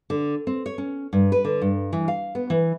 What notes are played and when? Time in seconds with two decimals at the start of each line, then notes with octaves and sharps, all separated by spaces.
0.10 D3
0.47 C4
0.66 C#5
0.78 C#4
1.13 G2
1.32 B4
1.45 D3
1.62 G2
1.93 E3
2.08 F5
2.35 B3
2.50 E3